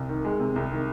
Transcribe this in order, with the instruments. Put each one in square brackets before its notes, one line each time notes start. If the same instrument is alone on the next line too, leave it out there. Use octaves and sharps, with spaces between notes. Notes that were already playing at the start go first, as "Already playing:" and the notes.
Already playing: [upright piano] C2
D#3
G#3
C3
C2
D#3